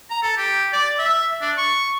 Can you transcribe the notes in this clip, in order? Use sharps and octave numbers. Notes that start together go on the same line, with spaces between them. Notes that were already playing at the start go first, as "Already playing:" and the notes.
A#5
A4
G4
D5
E5
D4
C#6